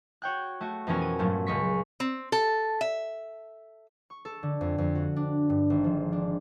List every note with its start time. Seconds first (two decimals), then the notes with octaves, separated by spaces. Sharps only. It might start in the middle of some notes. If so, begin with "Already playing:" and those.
0.22 F#4 C#5 G5 F#6
0.61 A3 F#4
0.87 F2 B2 E3 C#4 F#4 A#4
1.02 D#7
1.19 G2 A#2 F#3 A3
1.47 C#2 A#2 G#3 C#6 B6
2.00 C4
2.32 A4
2.81 E5
4.10 C#6
4.25 A4
4.43 D3
4.61 F2
4.78 F2
4.95 F#4
5.16 D4
5.50 G2
5.70 G#1
5.84 F3
6.12 D4